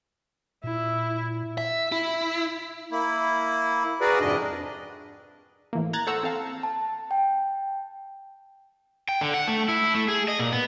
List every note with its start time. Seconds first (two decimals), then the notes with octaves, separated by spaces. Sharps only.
0.64 A#2 E4
1.58 E5
1.92 E4
2.92 A#3 E4
4.01 F#4 G#4 A#4 B4 D5
4.20 F2 G#2 C3 D4 D#5
5.73 A2 E3 A#3
5.93 A#5 F#6 G#6 A6
6.07 A4 C5 F#5 A#5 C#6 E6
6.23 C4 A4 F5 A5
6.63 A5
7.11 G5
9.09 G5
9.21 D3
9.34 F#5
9.48 A3
9.68 E4
9.95 A3
10.08 G#4
10.28 D#5
10.39 A#2
10.52 B3